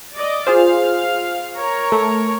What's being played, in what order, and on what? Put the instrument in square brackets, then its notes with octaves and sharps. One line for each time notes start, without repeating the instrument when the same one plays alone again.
[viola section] D5 D#5
[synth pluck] F4 G#4 C5 [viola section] F5
[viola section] A#4 C#5 A#5
[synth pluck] A3 A4